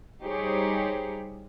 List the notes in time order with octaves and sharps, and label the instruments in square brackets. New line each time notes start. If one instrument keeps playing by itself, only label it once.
[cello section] G3 D#4 G4 G#4 C5 C#5